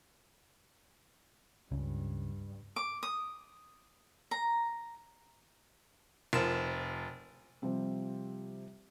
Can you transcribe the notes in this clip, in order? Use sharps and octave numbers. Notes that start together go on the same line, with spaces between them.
C#2 G2 C#3
D6
D#6
A#5
F1 F3 F4 A#4 E7
C3 F3 G3 C4